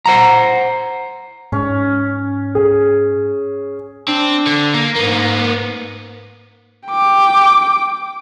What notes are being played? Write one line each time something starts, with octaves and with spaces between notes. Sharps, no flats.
C5 F#5 A#5
G#2 C#4
G#4
C4 D4
D3
A#3
G#2 A#3 B3
G5 D6